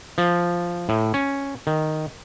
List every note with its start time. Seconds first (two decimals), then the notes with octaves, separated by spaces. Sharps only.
0.18 F3
0.89 A2
1.14 C#4
1.67 D#3